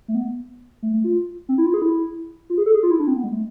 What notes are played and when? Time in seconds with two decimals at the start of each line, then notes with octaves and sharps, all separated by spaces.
0.08 A3
0.15 B3
0.82 A3
0.94 A3
1.04 F4
1.49 C4
1.58 E4
1.66 F4
1.74 G#4
1.82 E4
2.50 F4
2.58 G#4
2.66 A4
2.74 G#4
2.83 F4
2.91 E4
3.00 D4
3.07 C4
3.16 B3
3.24 G#3
3.32 A3